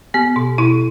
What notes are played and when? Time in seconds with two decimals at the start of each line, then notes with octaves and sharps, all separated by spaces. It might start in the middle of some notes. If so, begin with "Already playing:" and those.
0.14 B3 G4
0.36 B2
0.58 B2 E4